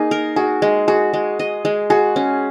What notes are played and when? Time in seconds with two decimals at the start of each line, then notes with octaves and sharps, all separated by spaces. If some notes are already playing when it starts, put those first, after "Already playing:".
Already playing: A#3 D#4 G#4
0.11 A#4
0.36 F#4 G#4
0.62 G#3
0.88 F#4 G#4
1.13 G#3
1.39 D#5
1.65 G#3
1.90 F#4 G#4
2.16 C#4